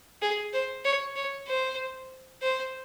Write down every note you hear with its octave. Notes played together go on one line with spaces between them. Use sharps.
G#4
C5
C#5
C#5
C5
C5